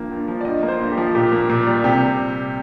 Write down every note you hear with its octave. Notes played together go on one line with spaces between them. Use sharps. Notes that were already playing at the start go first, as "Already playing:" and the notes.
Already playing: G2 F3 A#3
G2
F3
D5
G2 D#5
A#3
C5
G2
G4
F3
A#2 G4
A#3
A#2
G3
C3 G4